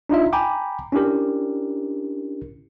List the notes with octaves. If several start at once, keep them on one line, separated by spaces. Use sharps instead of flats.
D4 D#4 F4 E5
G5 G#5 A#5 B5 D6
C#4 D4 E4 G4 A#4